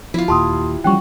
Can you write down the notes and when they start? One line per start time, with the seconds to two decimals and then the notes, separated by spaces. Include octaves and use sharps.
0.14 F3 E4 F4
0.28 D#2 A#2 G4 A5 C6 D#6
0.84 E3 F3 G3 C#4 F#5 G5 C#6